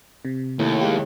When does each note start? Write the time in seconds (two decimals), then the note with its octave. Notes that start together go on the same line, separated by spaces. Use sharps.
0.25 C3
0.59 D#2 A2
0.81 G#3 E4 G4